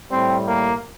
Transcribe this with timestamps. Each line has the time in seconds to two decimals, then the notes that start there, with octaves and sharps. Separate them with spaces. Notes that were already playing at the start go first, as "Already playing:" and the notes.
0.11 A2 G3 C4
0.47 A#3